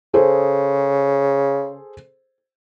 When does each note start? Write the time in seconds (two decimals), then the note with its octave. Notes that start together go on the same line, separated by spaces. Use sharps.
0.14 C#3 G#4 A4 C5